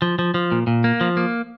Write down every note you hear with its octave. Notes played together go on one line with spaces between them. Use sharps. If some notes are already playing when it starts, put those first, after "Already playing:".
F3
F3
F3
A#2
A#2
A#3
F3
A#3